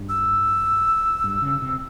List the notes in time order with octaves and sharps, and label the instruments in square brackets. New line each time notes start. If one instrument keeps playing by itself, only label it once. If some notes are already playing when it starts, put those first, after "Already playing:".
Already playing: [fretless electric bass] G2
[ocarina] E6
[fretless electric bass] G2
C#3
C3